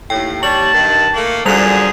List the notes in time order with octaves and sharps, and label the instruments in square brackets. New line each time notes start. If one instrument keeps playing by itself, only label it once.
[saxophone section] D#2 A2 [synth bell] G5
[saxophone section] D#2 G3 C#5 [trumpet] A5 [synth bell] F#7
[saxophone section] G2 D#3
A3 A#3
[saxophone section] F#2 A#2 D3 [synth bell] G3 F7 [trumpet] G#4